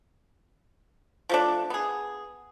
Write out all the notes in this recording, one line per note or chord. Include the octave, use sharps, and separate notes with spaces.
F3 A3 D4
B3 G#4